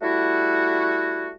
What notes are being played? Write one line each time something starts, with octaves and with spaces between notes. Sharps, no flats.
G3 A3 E4 F#4